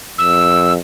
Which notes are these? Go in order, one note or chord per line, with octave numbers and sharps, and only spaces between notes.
F2 E6